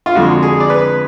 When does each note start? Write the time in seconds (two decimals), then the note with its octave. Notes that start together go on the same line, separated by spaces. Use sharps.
0.06 F4
0.15 F2 D3 G#3 F#4
0.43 G#4
0.60 D5
0.70 B4